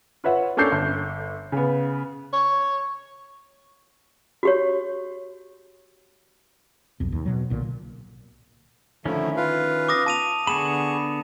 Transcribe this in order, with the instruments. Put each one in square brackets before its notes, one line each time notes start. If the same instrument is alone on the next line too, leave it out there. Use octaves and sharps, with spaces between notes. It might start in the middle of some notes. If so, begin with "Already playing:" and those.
[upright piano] F4 B4 C#5 E5 F#5
A#3 C#4 D4 A4 G6 C7
G1
C#3 B3
[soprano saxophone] C#5
[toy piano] F#4 G4 C#5
[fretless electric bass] B1 F2
D#2
B2 F#3
B1 A#2 D3
[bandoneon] D3 F3 A3 [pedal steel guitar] D#3 C#4 E4
[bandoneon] F4 B4 F5
[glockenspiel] D6 D#6 A#6
A5 D#7 F7
[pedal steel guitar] D3 B3 B5 [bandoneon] G#4 C#6 [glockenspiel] E7